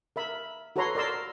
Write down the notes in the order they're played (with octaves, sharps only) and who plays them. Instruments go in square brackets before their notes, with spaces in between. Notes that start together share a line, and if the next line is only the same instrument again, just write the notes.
[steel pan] A#4 E5 B5
F#4 A4 B4 C#5 A#5 C6
A#4 D5 A#5 C6 E6